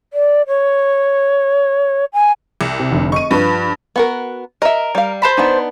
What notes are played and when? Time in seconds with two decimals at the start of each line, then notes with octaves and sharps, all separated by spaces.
0.13 D5
0.47 C#5
2.13 G#5
2.61 C2
2.80 C3
2.91 F1 D3
3.12 D#5 C#6 D#7
3.31 G2 F3 B4
3.96 B3 F#4 A#4
4.62 A#4 D#5 E5
4.95 G3 F5
5.22 C5 A5 B5
5.37 B3 D4 D#4